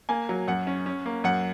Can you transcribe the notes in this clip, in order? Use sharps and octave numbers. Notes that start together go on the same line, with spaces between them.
A#3 G#5
F#3
F#2 F#5
C#4
C#4
A#3
F#2 F#5